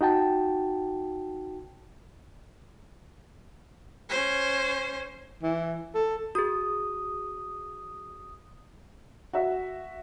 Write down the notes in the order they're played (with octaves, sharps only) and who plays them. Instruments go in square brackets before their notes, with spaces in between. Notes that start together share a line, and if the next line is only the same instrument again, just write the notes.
[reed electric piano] D#4 F#4 G5 A5
[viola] C#4 C5
[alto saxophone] E3
A4
[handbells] F#4 G#4 [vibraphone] D#6
[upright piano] F#4 E5